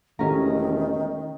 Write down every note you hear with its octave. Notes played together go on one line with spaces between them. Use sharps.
E1 D#3 A3 C#4 G4 A#5